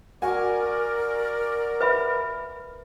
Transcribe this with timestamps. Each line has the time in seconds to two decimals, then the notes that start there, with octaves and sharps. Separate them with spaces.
0.22 F#4 A#4 D5 G#5
1.81 B4 E5 B5